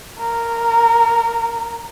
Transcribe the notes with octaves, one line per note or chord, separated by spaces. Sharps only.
A#4